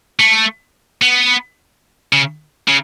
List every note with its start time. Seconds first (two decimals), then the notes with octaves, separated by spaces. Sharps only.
0.19 A3
1.02 B3
2.13 C#3
2.68 C#3